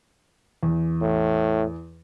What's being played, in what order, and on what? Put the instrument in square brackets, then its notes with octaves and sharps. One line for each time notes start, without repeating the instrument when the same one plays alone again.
[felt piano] E2
[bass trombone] A2